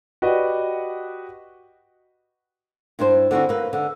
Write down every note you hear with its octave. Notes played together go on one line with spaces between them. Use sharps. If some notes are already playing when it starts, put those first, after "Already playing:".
F#4 G4 B4 D5 D#5 F#5
G2 D4 E4 C5
D3 C4 E4 F#4
A#3 B4
D3